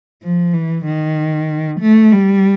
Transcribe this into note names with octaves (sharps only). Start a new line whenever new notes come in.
F3
E3
D#3
A3
G3